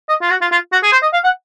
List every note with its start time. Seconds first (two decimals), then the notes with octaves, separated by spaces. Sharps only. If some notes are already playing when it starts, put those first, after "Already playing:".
0.09 D#5
0.21 F4
0.30 F#4
0.41 F4
0.52 F4
0.73 F#4
0.83 G#4
0.92 C5
1.02 D#5
1.13 F5
1.24 F#5